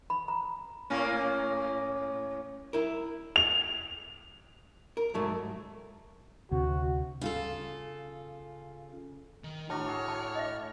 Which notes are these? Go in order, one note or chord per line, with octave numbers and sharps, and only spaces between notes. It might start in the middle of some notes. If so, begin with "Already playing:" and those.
B5
A#5
A2 A#3 C#4
E4 A#4
F7
A#4
G#2 F#3 A3
D2 C3 F#4
C#3 F4 A4
D#3
A2 D4 F#4 C#5 A5 A#5 F6
G#4
A5
D#5 E5